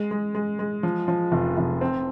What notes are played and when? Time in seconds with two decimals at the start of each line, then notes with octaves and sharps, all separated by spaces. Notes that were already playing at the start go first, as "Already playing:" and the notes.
Already playing: G#3
0.11 G#3
0.35 G#3
0.59 G#3
0.83 F3
1.08 F3
1.32 F1
1.57 F1
1.81 C4